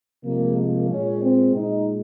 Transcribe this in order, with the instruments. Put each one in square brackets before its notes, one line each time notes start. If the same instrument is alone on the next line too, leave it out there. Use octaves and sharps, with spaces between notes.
[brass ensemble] C3 F3 G#3 A#3
A#3
A#2 G#3 C#4
C4
A#2 G#3 D#4